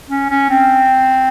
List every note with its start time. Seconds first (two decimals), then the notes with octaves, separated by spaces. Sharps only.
0.10 C#4
0.30 C#4
0.50 C4